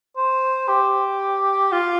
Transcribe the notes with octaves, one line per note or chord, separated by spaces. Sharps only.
C5
G4
F4